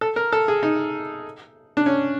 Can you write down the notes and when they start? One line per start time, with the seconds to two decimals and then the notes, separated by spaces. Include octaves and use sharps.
0.01 A4
0.16 A#4
0.32 A4
0.48 G#4
0.63 D#4
1.77 D4
1.86 C#4